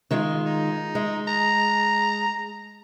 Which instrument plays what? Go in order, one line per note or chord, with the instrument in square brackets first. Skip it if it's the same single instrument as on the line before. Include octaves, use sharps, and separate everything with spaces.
[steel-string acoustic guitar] D#3 G#3 F4
[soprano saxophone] D#4
[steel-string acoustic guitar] G#3
[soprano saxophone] A#5